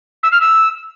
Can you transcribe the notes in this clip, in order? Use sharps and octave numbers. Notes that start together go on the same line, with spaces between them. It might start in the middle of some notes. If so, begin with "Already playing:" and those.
E6
F6
E6